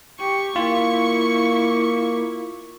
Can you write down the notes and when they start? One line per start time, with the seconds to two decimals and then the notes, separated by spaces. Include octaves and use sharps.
0.19 G4 C#6
0.56 A#3 E4 F4